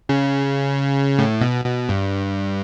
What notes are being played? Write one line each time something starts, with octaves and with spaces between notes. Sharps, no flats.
C#3
A2
B2
B2
G2